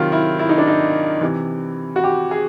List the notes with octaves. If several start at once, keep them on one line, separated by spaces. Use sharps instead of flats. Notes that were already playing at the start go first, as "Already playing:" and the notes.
Already playing: C3 D#3 F#3 F4
E4
E4
D#4
D4
D#4
C3 E3
F#4
G4
G#4